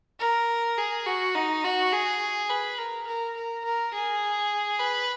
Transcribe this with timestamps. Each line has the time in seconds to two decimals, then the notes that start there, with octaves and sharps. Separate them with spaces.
0.20 A#4
0.78 G#4
1.06 F#4
1.35 D#4
1.64 F#4
1.92 G#4
2.50 B4
2.78 A#4
3.07 A#4
3.36 A#4
3.65 A#4
3.93 G#4
4.79 B4